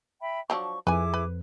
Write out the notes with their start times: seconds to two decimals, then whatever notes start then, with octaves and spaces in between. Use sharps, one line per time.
0.20 E5 G5 B5
0.50 F3 F#3 D4 C#6
0.87 F2 E4 G#4 B4 G#5 D6
1.14 B4